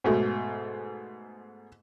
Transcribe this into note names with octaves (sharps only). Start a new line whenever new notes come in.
G#2 B2 A3